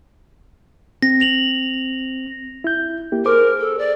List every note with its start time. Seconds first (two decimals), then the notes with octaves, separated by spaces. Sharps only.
1.02 C4 A#6
1.20 A#6 F7 F#7
2.64 E4 G6
3.12 A#3 E4 G4
3.25 G#4 A#4 C5 D6
3.60 A4
3.79 D5